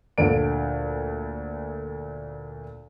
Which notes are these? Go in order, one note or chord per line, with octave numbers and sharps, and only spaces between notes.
D2 A#2 A4 D7